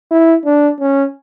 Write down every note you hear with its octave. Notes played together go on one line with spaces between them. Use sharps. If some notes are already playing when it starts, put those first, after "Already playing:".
E4
D4
C#4